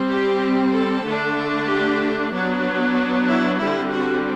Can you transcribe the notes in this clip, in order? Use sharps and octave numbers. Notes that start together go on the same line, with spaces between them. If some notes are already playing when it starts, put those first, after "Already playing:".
Already playing: G3 C4
G4
A4
D3 A3 D4
G4
F#3 B3 D4
E4
D3 G3 C4 E4
F#4